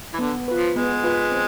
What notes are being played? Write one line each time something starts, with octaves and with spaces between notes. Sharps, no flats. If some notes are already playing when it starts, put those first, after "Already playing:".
E3
D3 B3
F4 B4
F3
G#3 B3
F4 B4
C4